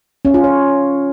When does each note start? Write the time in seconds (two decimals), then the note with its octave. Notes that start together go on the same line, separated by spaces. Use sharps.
0.25 C#4
0.34 F4
0.44 C#5